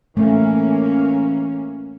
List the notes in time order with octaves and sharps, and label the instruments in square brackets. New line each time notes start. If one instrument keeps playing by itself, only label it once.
[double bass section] E3 A#3 C#4 [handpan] A3